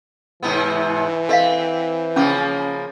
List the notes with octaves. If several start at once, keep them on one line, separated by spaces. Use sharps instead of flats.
G#2 C3 E3 B3
C4 A4 D#5 F5
C#3 F3 A#3 C#4 D6